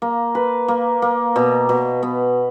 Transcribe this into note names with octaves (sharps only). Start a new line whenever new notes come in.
A#3
B4
A#3
A#3
B2
B2
B3